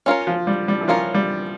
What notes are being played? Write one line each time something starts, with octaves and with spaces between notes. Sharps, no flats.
C#4 F4 A#4 C#5
F3
G3
G3
E3
F3 C#4 F4 A#4 C#5
G3